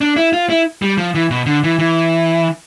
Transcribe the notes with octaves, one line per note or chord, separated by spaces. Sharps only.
D4
E4
F4
E4
G3
F3
E3
B2
D3
E3
E3